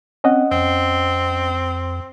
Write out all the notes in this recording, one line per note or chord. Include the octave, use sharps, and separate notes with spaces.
C4 C#4 D#5 F#5
F2 C4